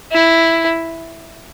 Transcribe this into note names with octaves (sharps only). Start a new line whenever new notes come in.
E4